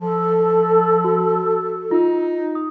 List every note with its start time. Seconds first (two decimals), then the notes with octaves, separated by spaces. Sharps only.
0.01 F3 A4
1.04 F#4
1.91 D#4 F4
2.55 D#6